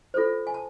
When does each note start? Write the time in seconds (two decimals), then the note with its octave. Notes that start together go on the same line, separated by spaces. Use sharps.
0.14 F4 A4 C5
0.47 G#5
0.54 A5